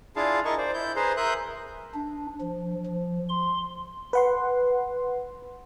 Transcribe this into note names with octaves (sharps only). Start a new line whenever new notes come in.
D4 E4 F4 G#4 F5 A5
E4 A#4 D#5 A5 C#6
C5 D5
E4 G6
G#4 B4 C5 A#5 C6
A#4 E5 C6 D#6 F#6 G6
D4
F3
F3
C6
B4 F#5 C6